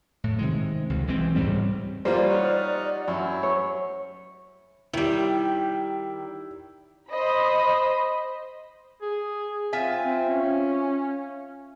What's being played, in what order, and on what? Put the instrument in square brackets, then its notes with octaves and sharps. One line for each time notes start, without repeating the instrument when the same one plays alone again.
[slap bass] A2
C3 D#3 G#3
C#2 C3
B1 E3 G#3 C4
C#2 G#2 G3 C4
[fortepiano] G3 A#3 F4 [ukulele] C5 [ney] D5
[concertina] D#4 F#5 F6 [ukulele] C#5
[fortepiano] F#2 [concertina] E4 [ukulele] C#5
[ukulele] C#5
[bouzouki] D#3 G3 [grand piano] E4
[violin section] C5 D#5 B5
[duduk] G#4
[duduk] C4 [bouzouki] F4 E5 G#5
[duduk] C4
C#4